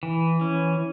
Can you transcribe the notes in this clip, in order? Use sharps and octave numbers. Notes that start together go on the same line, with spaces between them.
E3
C#4